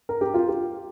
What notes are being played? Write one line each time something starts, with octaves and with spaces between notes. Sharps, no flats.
A#4
G4
F4
G4